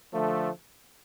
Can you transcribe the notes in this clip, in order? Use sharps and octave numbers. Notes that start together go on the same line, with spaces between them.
D3 F3 A3